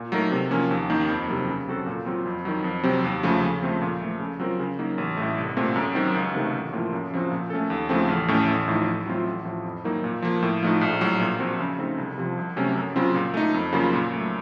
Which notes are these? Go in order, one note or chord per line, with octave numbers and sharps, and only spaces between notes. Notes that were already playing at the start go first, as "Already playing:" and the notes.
Already playing: A#2
F#3 A3 D#4 A#4
C3
F3 A#3 C#4
D#2
D#3 A#3
F2
C3 D#3 F#3 A#3
C#3
F#3 C4 F#4 A4
A#2
F#3 C4 F4
F2
D#3 F#3
F2
C3 F#3 C4
D#2
C#3 F3 A3
C#3
F3 A3 C4
A#2
F3 A3
C#3
F#3 C4 F4 A#4
C#3
F#3 A#3 D#4
A1
A2 A3
C2
A#2 A3 C4
F#2
D#3 F#3 C4
C#2
C3 D#3 A3
A1
A2 F3 A#3 F4
F#2
C#3 F3 C4 F#4
A#2
A3 C#4 A4
D#2
C#3 F3 A3 C4
A1
A2 A3 C#4
A1
A2 F3 A3 D#4
A2
F#3 A3 C4 F4
A1
A2 F3
F2
D#3 F#3 A#3 D#4
A#2
F3 A#3
A2
F3 A3 D#4
A#1
A2 F#3
A#2
F3 C4 F#4
C#3
A3 C4 D#4 A4
C2
C3 F3
C2
C3 F#3 A3 C#4
F#2
C#3 F#3 C4 F4
A#2
A3 D#4
F2
C#3 F#3 A#3 F4
A#2
F#3 A3